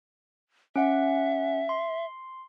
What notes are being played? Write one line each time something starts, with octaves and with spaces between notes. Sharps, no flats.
C#4 E5 F#5
C6